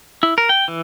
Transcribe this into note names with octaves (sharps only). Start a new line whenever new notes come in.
E4
A#4
G5
E3